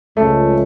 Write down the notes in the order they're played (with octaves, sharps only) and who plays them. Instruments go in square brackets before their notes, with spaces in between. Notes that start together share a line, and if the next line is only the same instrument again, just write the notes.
[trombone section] C#2 C#3 F3 G#3 C#4 [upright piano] A3